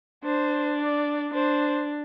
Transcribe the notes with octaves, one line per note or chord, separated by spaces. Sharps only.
D4 C5
D5
D4 C5